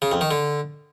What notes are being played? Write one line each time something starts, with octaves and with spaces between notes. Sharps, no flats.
C#3
F2
D#3
D3